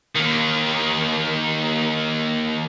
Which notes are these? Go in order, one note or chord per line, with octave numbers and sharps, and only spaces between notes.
D#2 D#3